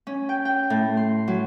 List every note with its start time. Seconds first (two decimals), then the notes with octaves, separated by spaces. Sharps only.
0.07 C#4
0.29 G5
0.45 G5
0.70 A2
0.97 C6
1.28 F#3